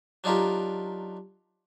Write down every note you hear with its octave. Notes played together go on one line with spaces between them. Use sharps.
F#3 D4 D#4 F4 G4 A#4